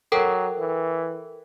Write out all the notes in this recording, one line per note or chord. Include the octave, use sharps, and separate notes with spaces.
F#3 A4 A#4 G5
E3